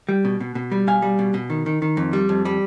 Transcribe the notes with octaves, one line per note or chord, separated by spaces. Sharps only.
G3
B2
B2
B2
G3
B2 F5 G#5
G3
B2
B2
D#3
D#3
D#3
F2
G3
F2
G3